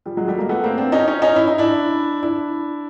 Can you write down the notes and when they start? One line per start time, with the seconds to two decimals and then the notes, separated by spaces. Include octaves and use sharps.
0.06 F3 G3
0.17 F#3 G#3
0.28 G3 A3
0.38 G#3 A#3
0.49 A3 B3
0.64 A#3 C4
0.78 C4 D4
0.92 C#4 D#4
1.07 C#4 D#4
1.22 C#4 D#4
1.36 E4
1.47 D#4
1.58 D4 E4
2.23 D4 E4